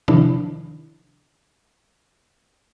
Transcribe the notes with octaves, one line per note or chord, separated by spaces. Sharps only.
C3 D#3 F3 D4 E4